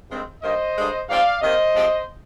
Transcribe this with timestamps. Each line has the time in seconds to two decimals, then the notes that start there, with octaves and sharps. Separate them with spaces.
0.10 G2 D#3 G#3 C4
0.42 G2 D#3 A#3 C5 D#5
0.77 G2 D3 G#3
1.09 G#2 F3 C4 D5 F5
1.42 C3 D#3 A#3 C5 D#5
1.75 C3 F3 G#3 C4